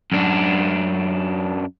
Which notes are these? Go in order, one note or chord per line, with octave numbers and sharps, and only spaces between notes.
F#2 D4